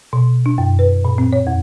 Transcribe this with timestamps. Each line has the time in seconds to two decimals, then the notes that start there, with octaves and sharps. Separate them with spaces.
0.13 B2
0.46 D4
0.58 F#2
0.79 B4
1.05 A#2
1.18 C4
1.33 C#5
1.47 F2